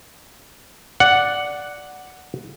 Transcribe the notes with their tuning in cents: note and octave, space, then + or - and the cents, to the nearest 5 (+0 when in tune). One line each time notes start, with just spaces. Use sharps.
D5 +0 F#5 +0